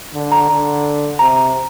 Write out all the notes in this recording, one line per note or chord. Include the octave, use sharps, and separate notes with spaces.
D3
A#5
D3
C3 A#5